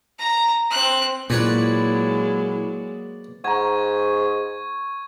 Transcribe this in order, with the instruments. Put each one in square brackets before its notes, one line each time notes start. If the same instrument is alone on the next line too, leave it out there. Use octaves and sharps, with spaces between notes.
[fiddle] A#5
C4 F#6
[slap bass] A#2 [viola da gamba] F#3 G#3 A#3 [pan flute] E4 [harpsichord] B4 C#5 D5
[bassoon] G#2 [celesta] F#5 A#5 [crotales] C#6 G#6